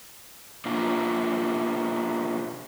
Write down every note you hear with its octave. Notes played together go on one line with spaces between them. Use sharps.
B2 A#3 D4 F4